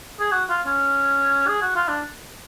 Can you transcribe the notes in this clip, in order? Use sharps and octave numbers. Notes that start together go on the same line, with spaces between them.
G#4
F#4
F4
C#4
G#4
F#4
F4
D4